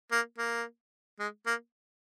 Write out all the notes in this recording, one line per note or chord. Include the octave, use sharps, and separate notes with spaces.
A#3
A#3
G#3
A#3